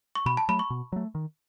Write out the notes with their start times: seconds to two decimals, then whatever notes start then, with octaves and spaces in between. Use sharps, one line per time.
0.15 C#6
0.26 B2 B5
0.37 A5
0.49 F#3 A3 B5
0.59 C#6
0.70 B2
0.92 F#3 A3
1.15 D#3